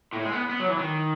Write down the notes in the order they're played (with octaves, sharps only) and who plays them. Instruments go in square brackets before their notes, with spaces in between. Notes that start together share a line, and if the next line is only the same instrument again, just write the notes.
[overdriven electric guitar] A2
G#3
B3
B3
F#3
E3
D#3